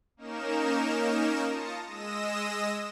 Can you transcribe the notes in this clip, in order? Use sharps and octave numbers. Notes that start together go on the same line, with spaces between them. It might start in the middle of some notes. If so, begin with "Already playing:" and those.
A#3 C#4 D#4 A#4 E7
F4 A5 D#6 A#6 C#7
G#3 D#5 D#6 E6 A#6 E7